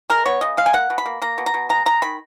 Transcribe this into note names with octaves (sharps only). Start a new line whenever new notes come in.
G#3 A#4
B3 C#5
C#3 D#5
G#3 F5
G#5
A#3 F#5
B2
B5
A#3
A#3 A#5
B2
A#5
B2
G#3 A#5
G#3 A#5
D#3 B5